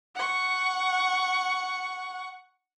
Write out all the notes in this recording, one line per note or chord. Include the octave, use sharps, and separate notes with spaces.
F#5 C#6